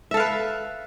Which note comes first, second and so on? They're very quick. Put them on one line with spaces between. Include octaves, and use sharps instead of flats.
E5 A4 F5 B4